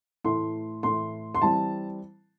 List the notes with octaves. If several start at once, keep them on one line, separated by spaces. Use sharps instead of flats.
A2 E3 A3 E4 C6
A2 E3 A3 E4 C6
C6
E3 G3 C4 A5